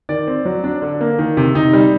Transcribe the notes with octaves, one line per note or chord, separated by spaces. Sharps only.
D#3 D5
C4
F#3
D4
D3
A#3
D#3
C3
C3 D#4
G3